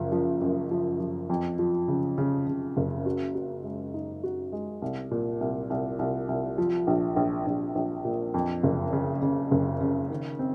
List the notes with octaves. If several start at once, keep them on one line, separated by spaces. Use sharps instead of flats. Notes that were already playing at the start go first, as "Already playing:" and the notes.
Already playing: F#1 F3
F3
F#2
F3
F3
F2
F3
C#3
C#3
C#3
F#1
F#4
F#4
G#3
D#4
F#4
G#3
C2
A#2
C2
C2
C2
C2
F3
A#1
A#1
A#1
A#1
A#2
F2
F#1
C#3
C#3
F#1
C#3
D#3
C4